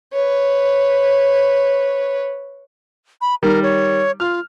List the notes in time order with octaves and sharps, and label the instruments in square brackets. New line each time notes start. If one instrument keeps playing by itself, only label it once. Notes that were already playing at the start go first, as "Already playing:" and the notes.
[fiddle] B4 C#5
[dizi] B5
[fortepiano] D#3 G3 [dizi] A#4
[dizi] C#5
[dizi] F4 [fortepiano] F6